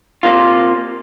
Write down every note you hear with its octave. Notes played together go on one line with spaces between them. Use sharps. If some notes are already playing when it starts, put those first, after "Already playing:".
C3 A#3 F4